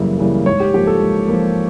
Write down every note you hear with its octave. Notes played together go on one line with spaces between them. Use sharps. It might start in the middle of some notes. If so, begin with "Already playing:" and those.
Already playing: F#2 C#3 E3 G3 A#3
C#3 E3 G3 A#3
G#2 C#5
G4
F3 A#3 G4
A4
G#2
F3 A#3